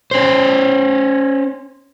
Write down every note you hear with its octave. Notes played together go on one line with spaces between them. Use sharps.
C#4 C5